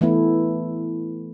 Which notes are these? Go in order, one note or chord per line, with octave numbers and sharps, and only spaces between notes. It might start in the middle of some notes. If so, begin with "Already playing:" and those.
E3 A3 B3 E4